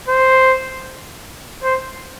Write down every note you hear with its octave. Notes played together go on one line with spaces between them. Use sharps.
C5
C5